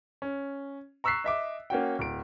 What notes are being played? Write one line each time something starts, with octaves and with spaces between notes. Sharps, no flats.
C#4
A#5 C#6 E6 F#6 B6 C7
D#5 E5 D6
A#3 C#4 F#4 G5
D1 D7